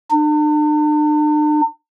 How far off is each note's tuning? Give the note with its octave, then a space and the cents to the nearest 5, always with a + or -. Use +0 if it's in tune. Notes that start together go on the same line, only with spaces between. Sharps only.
D4 +45